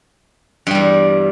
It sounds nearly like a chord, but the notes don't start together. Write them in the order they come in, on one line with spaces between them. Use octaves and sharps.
G2 G3 E2